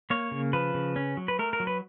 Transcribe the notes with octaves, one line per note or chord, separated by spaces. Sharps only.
A#3 C#5
C#3
F3 B4
C#3
C#4
F#3
B4
A3 A#4
A#4
F#3
B4